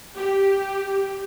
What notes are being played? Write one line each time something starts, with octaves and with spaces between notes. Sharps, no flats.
G4